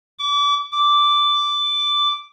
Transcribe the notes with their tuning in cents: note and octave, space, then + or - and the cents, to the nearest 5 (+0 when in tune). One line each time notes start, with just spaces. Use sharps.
D6 -30
D6 -5